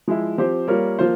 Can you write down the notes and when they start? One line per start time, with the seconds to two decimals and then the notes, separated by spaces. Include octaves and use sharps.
0.08 F3 G#3 E4
0.38 F3 C4 G4 C5
0.68 G3 A#3 F4 A#4 C#5
0.99 F3 A#3 F4 C5